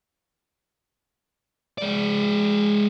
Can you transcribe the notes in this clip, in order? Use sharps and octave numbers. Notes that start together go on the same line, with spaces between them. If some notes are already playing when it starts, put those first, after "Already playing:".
G#3 D5